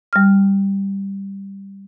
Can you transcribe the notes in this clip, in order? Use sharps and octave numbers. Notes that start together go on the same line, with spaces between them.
G3 F6